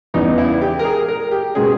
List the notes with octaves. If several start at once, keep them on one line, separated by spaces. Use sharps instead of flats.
E2 C#3 G3 B3 D#4
E4
G4
A#4
G#4
A#4
G4
B2 G#3 C#4 G#4